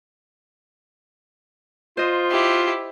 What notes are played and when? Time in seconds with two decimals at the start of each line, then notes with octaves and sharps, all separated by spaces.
1.97 F4 C5 D#5
2.30 E4 G4